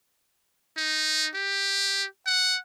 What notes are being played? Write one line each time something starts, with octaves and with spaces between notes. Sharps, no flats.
D#4
G4
F#5